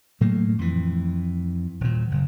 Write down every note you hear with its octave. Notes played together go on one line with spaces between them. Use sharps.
A2 F#3 A3 A#3
F2 E3
D#1 A#2
F#1